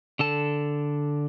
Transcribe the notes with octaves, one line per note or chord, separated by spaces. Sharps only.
D3 A4 A5